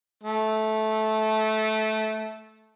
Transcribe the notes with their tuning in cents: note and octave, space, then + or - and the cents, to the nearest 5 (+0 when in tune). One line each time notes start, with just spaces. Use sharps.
A3 -15